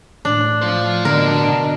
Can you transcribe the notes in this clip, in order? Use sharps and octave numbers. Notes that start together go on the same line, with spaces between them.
A2 D4
F4 C5
B2 D3 D4 A#4